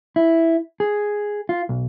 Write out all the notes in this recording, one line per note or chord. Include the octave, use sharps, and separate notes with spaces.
E4
G#4
F4
B1